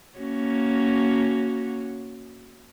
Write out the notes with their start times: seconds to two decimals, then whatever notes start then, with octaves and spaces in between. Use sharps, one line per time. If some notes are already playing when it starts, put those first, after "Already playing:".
0.18 A#3 C#4 F#4